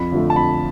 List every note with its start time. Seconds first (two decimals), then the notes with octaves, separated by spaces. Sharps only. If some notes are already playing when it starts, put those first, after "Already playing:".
Already playing: F2 B5
0.12 D3 F3 A3
0.30 A5
0.36 F2 B5